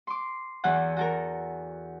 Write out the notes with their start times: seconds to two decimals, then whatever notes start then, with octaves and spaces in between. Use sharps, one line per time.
0.07 C6 D6
0.64 E2 E3 F#4 F#5
0.97 F#4 A4 A#4